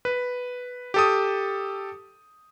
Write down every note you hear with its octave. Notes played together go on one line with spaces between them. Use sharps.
B4
G4 A4 D#6